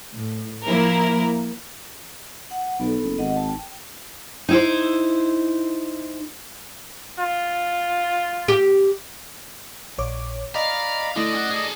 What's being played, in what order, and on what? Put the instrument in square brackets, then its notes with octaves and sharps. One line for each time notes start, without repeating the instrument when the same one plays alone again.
[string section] A2
F3 A#3 E4 A#4
[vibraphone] F#5
[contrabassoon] B1 [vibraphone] B3 A4
[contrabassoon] F#1
[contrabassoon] G#1 [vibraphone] D#5 F#5
[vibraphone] A5
G5
[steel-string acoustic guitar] D#4 E4 C5
[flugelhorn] F4
[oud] G4
[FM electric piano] A#1 C#5 D6
[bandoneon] D5 A#5 B5 [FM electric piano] D#5 [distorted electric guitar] F5
[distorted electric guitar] D3 [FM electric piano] A3 E4 [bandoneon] D5 D#5
[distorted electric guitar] C#4 F#5
G#4 A4